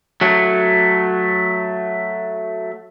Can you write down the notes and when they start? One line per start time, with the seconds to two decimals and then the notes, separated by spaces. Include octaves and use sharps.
0.21 F#3 A3